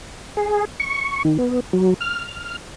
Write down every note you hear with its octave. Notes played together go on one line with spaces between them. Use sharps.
G#4
C#6
D#3
B3
F#3
F6